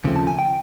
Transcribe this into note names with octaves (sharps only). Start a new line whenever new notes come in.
D#2 C#3 F3 A3 C4
A5
G#5
G5